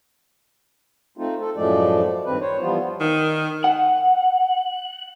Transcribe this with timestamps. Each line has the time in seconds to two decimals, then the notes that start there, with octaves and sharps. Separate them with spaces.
1.18 A3 C4 D#4 F4
1.41 A4
1.56 F#2 A2 F3 G#3 A3 D5
2.26 G2 D#3 C4 B4
2.41 C5 C#5
2.61 E3 F3 G3 B3 F4
3.01 D#3
3.64 F#5